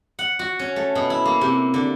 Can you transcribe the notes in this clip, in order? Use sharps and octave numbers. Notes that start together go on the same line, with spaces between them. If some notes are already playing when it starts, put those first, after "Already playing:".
F#5
F#4
C#4
A3
B2
E4
A#3
C3
D3